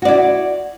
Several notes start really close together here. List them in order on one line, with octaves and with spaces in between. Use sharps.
F#4 D5 E4